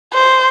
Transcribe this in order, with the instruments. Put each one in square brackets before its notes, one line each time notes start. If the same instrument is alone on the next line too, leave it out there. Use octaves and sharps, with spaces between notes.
[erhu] C5